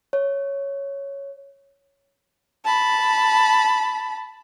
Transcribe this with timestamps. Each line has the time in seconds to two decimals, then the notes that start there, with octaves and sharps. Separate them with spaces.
0.13 C#5
2.64 A5 B5